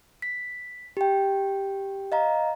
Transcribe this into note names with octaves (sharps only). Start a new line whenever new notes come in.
B6
G4 G5
D#5 F5 A#5